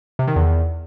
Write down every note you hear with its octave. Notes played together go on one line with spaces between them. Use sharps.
C3
D#3
E2